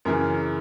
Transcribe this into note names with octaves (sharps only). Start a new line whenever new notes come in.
F#2 C#3 E3 A#4